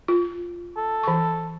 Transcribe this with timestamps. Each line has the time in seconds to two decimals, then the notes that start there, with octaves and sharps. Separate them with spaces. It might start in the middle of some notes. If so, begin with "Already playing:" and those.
0.08 F4
0.77 A4
1.03 E3 C#6